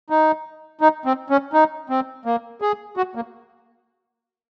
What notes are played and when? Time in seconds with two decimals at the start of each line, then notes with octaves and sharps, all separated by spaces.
0.10 D#4
0.81 D#4
1.06 C4
1.30 C#4
1.53 D#4
1.90 C4
2.25 A#3
2.61 G#4
2.97 F#4
3.15 A#3